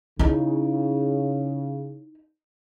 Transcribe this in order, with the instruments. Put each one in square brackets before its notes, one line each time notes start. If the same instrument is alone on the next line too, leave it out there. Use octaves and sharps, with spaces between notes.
[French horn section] C#3 [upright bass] D#4 E4